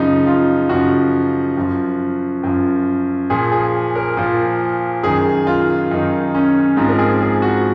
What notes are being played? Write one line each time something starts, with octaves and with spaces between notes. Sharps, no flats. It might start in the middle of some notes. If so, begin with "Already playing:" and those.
Already playing: F#2 C#3 F3 D#4
F4
F#2 C#3 F3 F#4
F#2 F3
F#2 F3
A#2 F3 G#4
G#4
A#4
A#2 F3
F#2 D#3 G#4
F4
F#2 D#3 D#4
C#4
G#2 F3 C4
A#4
G#4
G#4
F#4